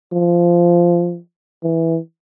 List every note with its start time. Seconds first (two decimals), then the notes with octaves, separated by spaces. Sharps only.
0.13 F3
1.63 E3